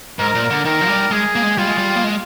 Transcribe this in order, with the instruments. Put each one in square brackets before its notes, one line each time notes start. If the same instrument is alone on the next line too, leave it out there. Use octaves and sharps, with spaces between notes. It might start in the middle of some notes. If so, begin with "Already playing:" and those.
[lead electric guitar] G#2 [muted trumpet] A#4
[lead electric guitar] A#2
D3
[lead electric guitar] D#3 [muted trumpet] A#4
[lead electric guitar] F3
G3
[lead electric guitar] G#3 [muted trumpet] G#4
[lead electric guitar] A#3
G#3
[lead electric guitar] G3 [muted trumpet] F4
[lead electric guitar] G#3
G3
A#3
G#3